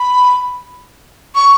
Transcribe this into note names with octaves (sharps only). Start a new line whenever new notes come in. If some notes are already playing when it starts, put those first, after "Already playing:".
Already playing: B5
C#6